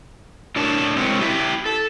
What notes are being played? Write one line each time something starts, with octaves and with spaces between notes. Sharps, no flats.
A2 D4 A#4 C#5 A5
F#3 G#3 C4 E4 A#4 C#5
E4 G4 E5
A4